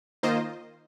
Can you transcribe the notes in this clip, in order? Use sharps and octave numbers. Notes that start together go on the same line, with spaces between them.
D#3 A#3 F4 C5 D#5